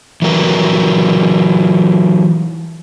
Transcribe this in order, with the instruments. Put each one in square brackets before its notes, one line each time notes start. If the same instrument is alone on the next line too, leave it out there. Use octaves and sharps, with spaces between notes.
[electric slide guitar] E3 F#3 A#4 B4